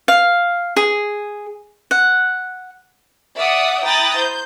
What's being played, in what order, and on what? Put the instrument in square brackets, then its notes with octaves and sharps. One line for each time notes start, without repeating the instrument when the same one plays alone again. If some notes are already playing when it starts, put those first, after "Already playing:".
[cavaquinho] F5
G#4
F#5
[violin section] D5 E5 F#5 D#6
E4 G5 A#5 D#6 F#6 A6
C5 G6